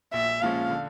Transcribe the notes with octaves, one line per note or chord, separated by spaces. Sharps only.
A#1 E5
A#2 F3 G#3 C#4 F5
D3